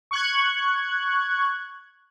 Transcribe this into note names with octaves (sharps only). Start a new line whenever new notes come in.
C#6 F#6 G#6